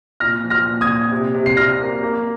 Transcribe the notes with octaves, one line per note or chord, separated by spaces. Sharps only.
A#2 F6 A#6
F3
F6 A#6
A#2
D#6 G#6
A#2
C3
C3
C7
C3 F6 A#6
A#3
A#3